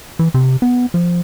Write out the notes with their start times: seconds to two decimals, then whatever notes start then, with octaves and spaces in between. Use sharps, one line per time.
0.19 E3
0.34 C3
0.62 B3
0.94 F3